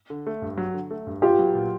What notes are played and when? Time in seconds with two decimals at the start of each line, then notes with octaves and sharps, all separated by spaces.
0.10 D3
0.27 A3
0.42 G2
0.58 F#3
0.74 D3
0.91 A3
1.07 G2
1.22 B3 F4 G4
1.39 F#3
1.55 A#2